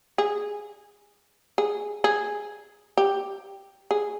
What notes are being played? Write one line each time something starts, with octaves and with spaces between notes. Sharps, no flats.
G#4
G#4
G#4
G4
G#4